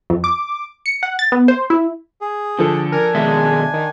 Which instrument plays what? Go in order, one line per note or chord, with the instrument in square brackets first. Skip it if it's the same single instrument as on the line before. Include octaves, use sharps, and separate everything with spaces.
[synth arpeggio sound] F2
D6
C#7
F#5
A6
B3
C5
E4
[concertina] G#4
[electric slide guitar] D3 [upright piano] F3 A4
[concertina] D4 G#5 [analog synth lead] A#4
[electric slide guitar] B2 D#3 E5 [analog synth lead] G#3
[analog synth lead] D#3